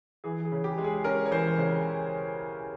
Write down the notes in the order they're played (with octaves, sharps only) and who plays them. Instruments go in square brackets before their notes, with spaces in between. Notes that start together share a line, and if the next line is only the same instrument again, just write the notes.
[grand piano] E3 G#4
G#4
C#3
G4
G#3
G#4
C#4 A#4
C#5
E3 C5
C#3 C5